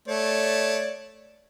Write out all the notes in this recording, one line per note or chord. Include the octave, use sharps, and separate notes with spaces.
A3 C#5 D5